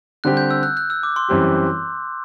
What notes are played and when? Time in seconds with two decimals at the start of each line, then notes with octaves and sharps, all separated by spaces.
0.24 D3 G3 C4 G4 F#6
0.37 G6
0.50 E6
0.63 F#6
0.77 F#6
0.90 E6
1.03 D6
1.16 C6
1.29 F#2 E3 G3 C4 G4